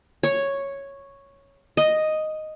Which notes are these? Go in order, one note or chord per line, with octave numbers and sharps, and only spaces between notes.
C#5
D#5